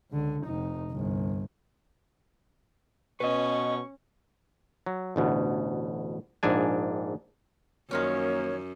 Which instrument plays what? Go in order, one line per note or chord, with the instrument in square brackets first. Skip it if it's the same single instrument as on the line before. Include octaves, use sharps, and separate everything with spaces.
[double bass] C#2 D3
F1 D#4
G1 C2
[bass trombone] B2 [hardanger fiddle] C#4 [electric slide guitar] B4 D#5 [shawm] C#6
[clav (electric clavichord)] F#3
A1 D2 B2
A#1 G#2 D4 G#5
[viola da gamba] F#2 [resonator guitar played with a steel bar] D#3 F3 C#4 [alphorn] A#3 [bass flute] C#5